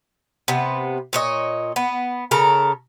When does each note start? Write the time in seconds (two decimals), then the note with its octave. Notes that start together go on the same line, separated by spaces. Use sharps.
0.48 C3 B3
1.13 A#2 C#5 D#5
1.76 B3
2.31 C#3 A4 A#4 A#5